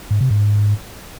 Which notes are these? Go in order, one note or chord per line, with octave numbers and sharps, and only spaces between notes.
G#2
C3
G#2